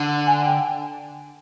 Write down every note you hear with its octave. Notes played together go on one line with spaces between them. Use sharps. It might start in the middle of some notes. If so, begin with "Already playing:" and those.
Already playing: D3
G#5
G5